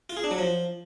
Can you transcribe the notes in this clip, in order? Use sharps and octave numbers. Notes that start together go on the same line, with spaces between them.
F4
G#4
D4
F#3
F3